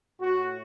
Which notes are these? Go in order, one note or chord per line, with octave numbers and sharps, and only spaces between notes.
A2 A3 F#4